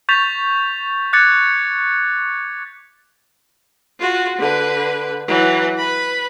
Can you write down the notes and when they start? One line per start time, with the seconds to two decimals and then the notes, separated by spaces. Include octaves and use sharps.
0.09 C#6 G6 A6 B6 F7
1.13 D6 F#6 G#6 A6 C#7
3.99 F4 F#4
4.38 D3 B4
5.27 E3 F#3
5.78 B4 B5